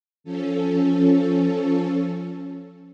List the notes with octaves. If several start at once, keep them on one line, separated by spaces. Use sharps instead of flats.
F3 C#4 A4